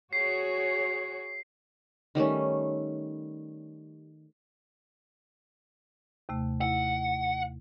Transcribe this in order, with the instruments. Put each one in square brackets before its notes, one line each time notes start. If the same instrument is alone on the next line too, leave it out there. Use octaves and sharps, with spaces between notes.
[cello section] F#4 G#4 C#5 [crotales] C7
[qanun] D#3 G3 A3 C#4
[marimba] D#2 C3 A3
[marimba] E4 [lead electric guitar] F#5